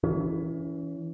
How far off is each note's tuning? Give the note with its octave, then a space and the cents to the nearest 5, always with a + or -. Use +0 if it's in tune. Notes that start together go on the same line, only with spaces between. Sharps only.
E3 +0 C#4 +30